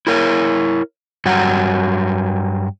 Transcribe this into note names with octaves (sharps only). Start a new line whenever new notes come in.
E4 A#4 C#5
G2 F#3 F#5